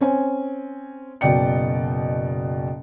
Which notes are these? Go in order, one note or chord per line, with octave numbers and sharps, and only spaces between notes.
C4 C#4 G#5
F#1 B2 D5 G5 C#7